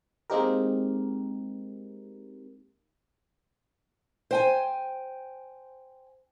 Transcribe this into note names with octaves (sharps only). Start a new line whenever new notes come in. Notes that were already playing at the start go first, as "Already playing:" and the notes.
G#3 A#3 C4 D#4 G4 A#4
C5 G5 G#5